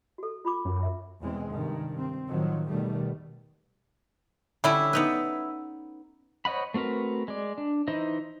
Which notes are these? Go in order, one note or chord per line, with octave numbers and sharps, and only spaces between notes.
F#4 A4
F4 B5 D6
F#2
E5
E2 B2 E3 G#3 C4
G2 C3 D#3
C4
A2 D#3 F3 F#3
E2 B2 D#3 G3 A3
D3 G3 C#4 D4 E4
B3 D#4 B4
C5 C#5 D#5 F#5 B5
A3 C4 F#4 A#4 B4
G#3 D5
D4
E3 D#4 E4 C5 D#5